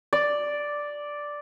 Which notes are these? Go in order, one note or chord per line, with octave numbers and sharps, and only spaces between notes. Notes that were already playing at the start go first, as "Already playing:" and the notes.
D5